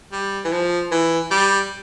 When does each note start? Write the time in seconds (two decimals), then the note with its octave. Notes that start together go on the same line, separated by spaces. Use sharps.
0.12 G3
0.45 E3
0.52 F3
0.92 E3
1.31 G3